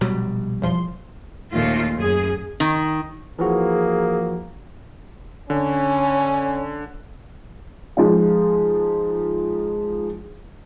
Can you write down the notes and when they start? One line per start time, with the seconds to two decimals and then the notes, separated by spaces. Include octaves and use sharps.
0.01 A#1 B2 F#3 G3
0.62 E2 F3 C6
1.53 D#2 A#2 A3 F4
1.96 F#2 G#4
2.60 D#3
3.39 E3 F3 A#3 F#4 G#4
5.50 D3 C#4
7.97 F3 G#3 D#4 F4